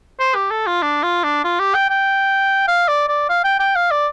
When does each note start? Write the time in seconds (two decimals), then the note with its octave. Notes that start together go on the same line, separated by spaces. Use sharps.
0.20 C5
0.35 G4
0.51 A4
0.67 F4
0.82 D4
1.03 F4
1.24 D4
1.44 F4
1.59 G4
1.75 G5
1.90 G5
2.68 F5
2.88 D5
3.08 D5
3.30 F5
3.44 G5
3.60 G5
3.75 F5
3.91 D5